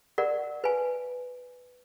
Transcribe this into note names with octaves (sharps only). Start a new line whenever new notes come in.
A#4 D5 F#5
B4 G#5